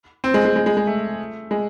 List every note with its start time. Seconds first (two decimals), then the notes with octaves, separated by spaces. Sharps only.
0.24 C4
0.34 G#3
0.45 G#3
0.56 G#3
0.66 G#3
0.77 G#3
0.87 A3
1.51 G#3